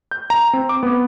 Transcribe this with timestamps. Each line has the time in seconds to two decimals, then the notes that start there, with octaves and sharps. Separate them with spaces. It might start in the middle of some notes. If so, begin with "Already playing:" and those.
0.11 G6
0.30 A#5
0.53 C4
0.69 D6
0.83 B3